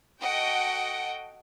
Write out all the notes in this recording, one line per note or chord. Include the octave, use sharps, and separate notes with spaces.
F#4 A4 D#5 F#5 G5